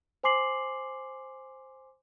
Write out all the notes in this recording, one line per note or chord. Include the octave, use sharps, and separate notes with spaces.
C5 G#5 C6 D6 C7 F#7